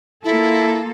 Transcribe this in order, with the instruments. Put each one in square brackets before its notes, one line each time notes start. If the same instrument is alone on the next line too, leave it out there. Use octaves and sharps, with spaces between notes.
[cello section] A#3 F4 A4 [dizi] E4